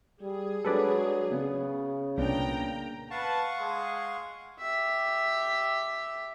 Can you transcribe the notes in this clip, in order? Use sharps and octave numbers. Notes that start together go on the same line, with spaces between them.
G3 G#4
F#3 G#3 D4 A4 B4 D5
C#3 B3
C2 A#2 A#3 B3 D4 G5 A#5
B4 F5 F#5 A5 C#6
G#3 G#4 C6
G4 E5